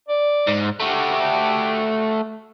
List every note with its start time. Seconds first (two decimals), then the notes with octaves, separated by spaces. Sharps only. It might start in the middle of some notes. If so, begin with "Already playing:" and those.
0.08 D5
0.47 G#2
0.80 A3 F#4 G4